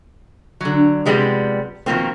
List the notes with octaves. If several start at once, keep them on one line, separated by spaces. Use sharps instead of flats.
D3 F#3
C3 F3 G3 G#3 B3
B2 D#3 F3 A#3 C4